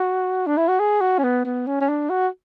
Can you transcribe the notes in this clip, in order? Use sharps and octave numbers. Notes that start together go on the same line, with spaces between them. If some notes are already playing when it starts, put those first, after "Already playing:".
Already playing: F#4
D4
E4
F#4
G#4
F#4
C#4
B3
B3
C#4
C#4
D4
F#4